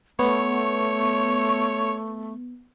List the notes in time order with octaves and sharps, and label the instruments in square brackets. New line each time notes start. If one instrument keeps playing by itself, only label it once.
[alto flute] A3 [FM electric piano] B3 [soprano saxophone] C#5